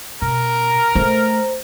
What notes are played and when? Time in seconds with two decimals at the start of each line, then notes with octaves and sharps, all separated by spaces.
0.22 B2 A#4 A#5
0.95 A3 C5